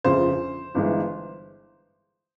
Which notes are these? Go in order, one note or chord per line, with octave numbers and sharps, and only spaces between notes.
G1 F2 C#3 C5
G1 G2 E3 G#3